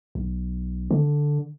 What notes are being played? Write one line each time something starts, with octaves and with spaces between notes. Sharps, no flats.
B1
D3